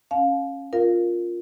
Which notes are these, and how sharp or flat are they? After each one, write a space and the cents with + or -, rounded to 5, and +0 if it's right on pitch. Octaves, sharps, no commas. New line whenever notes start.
C#4 -15 F5 +15 A5 -45
F4 +5 A#4 +0 F5 +0